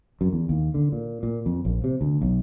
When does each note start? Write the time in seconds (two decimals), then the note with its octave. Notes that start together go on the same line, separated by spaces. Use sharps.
0.21 F#2
0.33 E2
0.49 D#2
0.74 D3
0.92 A#2
1.23 A#2
1.46 F2
1.65 A#1
1.84 C3
2.01 D2
2.21 B1